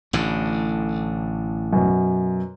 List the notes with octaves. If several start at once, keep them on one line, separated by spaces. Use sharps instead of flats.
A1 A2 D3
F#2 B2